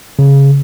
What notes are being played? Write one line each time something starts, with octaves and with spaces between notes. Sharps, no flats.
C#3